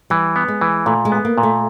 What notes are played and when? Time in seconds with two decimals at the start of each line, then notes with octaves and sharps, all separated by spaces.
0.10 E3 G3
0.36 B3
0.48 G#3
0.61 E3
0.86 A#2 A3
1.05 G#3
1.12 B3
1.25 A#3
1.38 A#2
1.43 A3